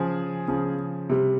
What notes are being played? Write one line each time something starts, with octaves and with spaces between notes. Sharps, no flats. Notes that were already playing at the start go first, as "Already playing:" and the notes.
Already playing: C#3 F3 G#4
C#3 F3
C3 G3